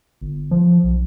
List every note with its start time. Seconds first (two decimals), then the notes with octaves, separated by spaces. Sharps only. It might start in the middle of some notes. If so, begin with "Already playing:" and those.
0.21 G1
0.51 F3
0.83 B1